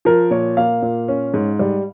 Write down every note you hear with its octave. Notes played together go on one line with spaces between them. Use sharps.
F3 A#4
A#2 C#5
A#3 F5
A#2
C#4
G#2
G3